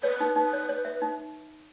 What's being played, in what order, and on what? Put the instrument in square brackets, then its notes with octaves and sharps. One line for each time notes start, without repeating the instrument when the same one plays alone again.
[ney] B4 [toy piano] C#5
[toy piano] D#4
[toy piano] D#4 [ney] B4
[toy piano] C#5
C#5
E5
D#4